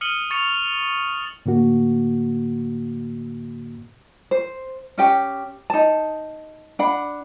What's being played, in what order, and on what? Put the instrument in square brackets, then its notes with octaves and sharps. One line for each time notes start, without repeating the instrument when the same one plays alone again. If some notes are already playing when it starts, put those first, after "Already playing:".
[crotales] D#6 F6 C#7 D#7 F#7 G7
C#6 A6 C#7 F7
[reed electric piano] A2 D3 A#3 F#4
[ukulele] C5
C#4 G4 G5
D#4 A5
D4 F#5 B5